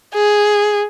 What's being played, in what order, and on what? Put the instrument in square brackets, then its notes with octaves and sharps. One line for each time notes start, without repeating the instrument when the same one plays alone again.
[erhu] G#4